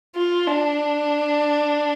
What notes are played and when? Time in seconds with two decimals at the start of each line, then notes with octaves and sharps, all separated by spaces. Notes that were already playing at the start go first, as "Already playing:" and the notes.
0.16 F4
0.47 D4